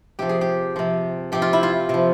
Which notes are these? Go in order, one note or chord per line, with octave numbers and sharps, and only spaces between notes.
C3 F3 G4
G#4
G4
C3 F3
C3 F3 G4
F4
E4
F4
C3 F3